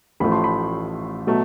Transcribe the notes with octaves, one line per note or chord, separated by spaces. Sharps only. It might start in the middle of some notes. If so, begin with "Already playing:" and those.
A1 A2 F3 A3 B5
C6
B5
B2 F#3 A3